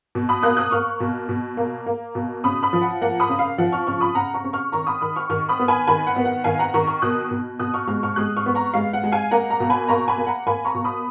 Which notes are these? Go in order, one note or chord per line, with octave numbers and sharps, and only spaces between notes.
B2
B5 D#6
A#3 D#6 F#6
D#6 F#6
A#3 C#6 F6
B2
B2
A#3
A#3
B2
C#3 B5 D#6
B5 D#6
F3
F#5
A#3 F#5
B5 D#6
C#3
F5
F3 F#5
C#6 F6
C#3 C#6 F6
B5 D#6
C#3 F#5 A#5
A#5 C#6
C#3
C#6 F6
D#3 A#5 C#6
B5 D#6
D#3 B5 D#6
C#6 F6
D#3 C#6 F6
B5 D#6
B3
G#5 B5
D#3 G#5 B5
F#5
B3
F#5
D#3 F5 G#5
F#5 A#5
D#3 A#5 C#6
C#6 F6
B2 D#6 F#6
B2
B2 D#6 F#6
C#6 F6
G#3 C#6 F6
C#6 F6
G#3 D#6 F#6
C#6 F6
B3
A#5 C#6
G#3 F5
F#5
G#3
F5 G#5
A#3 F#5 A#5
F#5 A#5
B2
G#5 B5
A#3 A#5 C#6
G#5 B5
A#3
F#5 A#5
A#3 G#5 B5
A#5 C#6
B2
B5 D#6